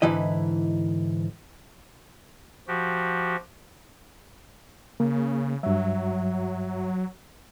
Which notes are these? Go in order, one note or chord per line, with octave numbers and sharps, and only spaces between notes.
G#2 D3 E3 E4 D#5
F3 F#4 G4
C#3 A#3
G2 F#3 E5